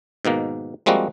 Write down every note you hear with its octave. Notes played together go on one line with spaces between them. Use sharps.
G#2 B2 D#3 A#3
F3 G3 G#3 A#3 C4 F#4